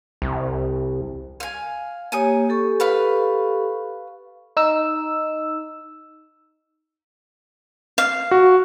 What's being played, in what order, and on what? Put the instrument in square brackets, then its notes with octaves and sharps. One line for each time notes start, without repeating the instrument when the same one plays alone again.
[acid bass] C2
[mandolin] F5 G#5
[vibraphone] A#3 G4 C#5 [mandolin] G#5 D#6
[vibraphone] G4 A4 C#6
[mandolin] B4 F5 B5
[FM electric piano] D#4 E6
[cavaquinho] F5
[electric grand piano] F#4